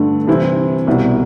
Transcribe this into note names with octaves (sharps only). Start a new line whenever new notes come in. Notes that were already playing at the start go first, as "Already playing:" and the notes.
Already playing: G2 D3 A3
C3 E3 G3 C4 E4
C2 B2 G3